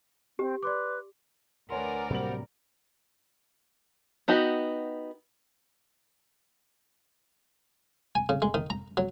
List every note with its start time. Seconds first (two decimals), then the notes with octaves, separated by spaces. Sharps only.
0.39 C4 G4
0.63 B4 D5 C6 D6
1.70 D2 A#4 B4 C#5 D5 F#5 G#5 C6
2.11 A2 C3 F#3 G3 A#3 C5 F#5 F#7
4.28 B3 D#4 F#4 G4
8.15 G#5
8.29 C#3
8.42 G#3
8.54 D#3
8.70 A#5
8.97 F#3